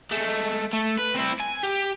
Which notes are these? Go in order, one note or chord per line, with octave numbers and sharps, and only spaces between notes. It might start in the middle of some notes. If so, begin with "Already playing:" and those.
G#3 A3
A3
B4
C4 E4
G#5
G4